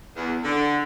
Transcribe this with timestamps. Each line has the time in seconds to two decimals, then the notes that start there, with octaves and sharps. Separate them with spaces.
0.16 E2
0.44 D3